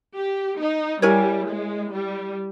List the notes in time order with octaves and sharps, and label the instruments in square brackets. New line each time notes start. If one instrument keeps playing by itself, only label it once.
[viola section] G4
D#4
[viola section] G3 [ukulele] E4 A#4 C#5 G#5
[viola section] G#3
G3